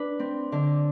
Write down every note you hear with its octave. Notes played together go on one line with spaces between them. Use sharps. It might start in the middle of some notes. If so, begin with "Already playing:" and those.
Already playing: D4 B4
C4
D3